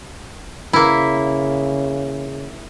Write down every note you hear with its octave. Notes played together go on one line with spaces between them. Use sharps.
C#3 A#3 E4